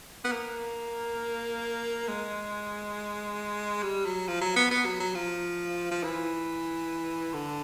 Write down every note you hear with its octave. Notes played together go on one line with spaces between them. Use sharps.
B3
A#3
G#3
G3
F#3
F3
F#3
B3
B3
F#3
F#3
F3
F3
E3
D3